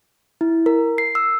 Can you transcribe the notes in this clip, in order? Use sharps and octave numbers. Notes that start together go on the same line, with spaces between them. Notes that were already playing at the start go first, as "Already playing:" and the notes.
E4
A#4
C7
E6